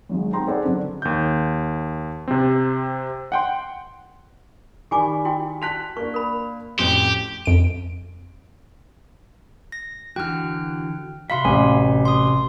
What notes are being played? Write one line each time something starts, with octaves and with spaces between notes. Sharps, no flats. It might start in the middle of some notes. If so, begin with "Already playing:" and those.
G#1 F#3 G#3
C4 D#4 F#5 G5 A#5 C6
B3 G#4 A4 C5 D5 F#5
D3 F#3 D4
D#2 G6
C3 C4
F#5 G5 C6
D#3 G4 D5 G#5 B5 D6
E4 F#4 G5
F#4 F#5 A5 F#6 B6 F7
A#3 D4 C#6
A#4 B5
F2 A2 C#4 F#4 G4 C5
F2 D7
A#6
D3 E3 F#4 G5 F6
C3 F#4 E5 F5 B5 C6
A1 G#5
C6 D#6